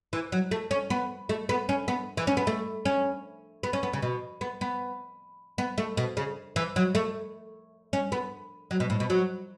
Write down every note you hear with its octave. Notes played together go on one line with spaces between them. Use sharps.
E3
F#3
A3
C#4
B3
A3
B3
C#4
B3
E3
C#4
B3
A3
C#4
B3
C#4
B3
C#3
B2
B3
B3
B3
A3
B2
C#3
E3
F#3
A3
C#4
B3
F#3
B2
A2
B2
F#3